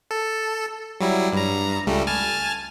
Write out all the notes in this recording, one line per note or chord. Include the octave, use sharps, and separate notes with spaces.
A4
F#3 G3 E4
G2 A#5
C#2 G3 A3
G#5 A5 F6